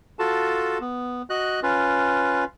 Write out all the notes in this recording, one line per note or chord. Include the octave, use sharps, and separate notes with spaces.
F4 F#4 A4 A5
B3
F#4 D#5 F#6
C#4 F4 B4